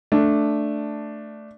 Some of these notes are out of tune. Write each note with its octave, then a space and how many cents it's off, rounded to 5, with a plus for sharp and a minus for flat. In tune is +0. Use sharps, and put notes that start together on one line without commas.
A3 +0 D4 +0